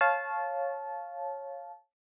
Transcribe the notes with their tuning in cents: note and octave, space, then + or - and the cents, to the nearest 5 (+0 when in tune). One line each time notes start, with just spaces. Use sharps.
C#5 -10 F5 +0 A5 -20